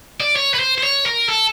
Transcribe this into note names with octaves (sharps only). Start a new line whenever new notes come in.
D5
C#5
B4
C5
C5
C#5
A#4
A4